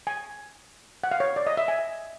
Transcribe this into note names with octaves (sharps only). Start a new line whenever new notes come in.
G#5
F#5
F5
C#5
D5
D#5
E5
G#5